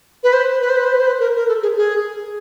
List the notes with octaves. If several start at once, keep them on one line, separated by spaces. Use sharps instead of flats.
B4
C5
B4
C5
B4
C5
B4
C5
B4
A#4
A#4
A4
G#4
G#4